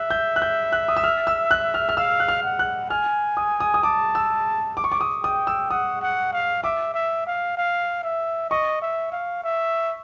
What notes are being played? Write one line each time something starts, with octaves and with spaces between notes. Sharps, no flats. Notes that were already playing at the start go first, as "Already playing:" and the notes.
Already playing: E5 F#6
G6
F#6
G6
F#6
D#6
E6
F6
E6
F#6
F6
F6
F5 E6
F#6
F6
F#5
F#6
G#5 F6
D#6
D#6
D#6
A5 D6
E6
D6
C#6
D6
D#6
G5 D#6
E6
F#5 D#6
F#5
F5
E5 D6
E5
F5
F5
E5
D#5 C#6
E5
F5
E5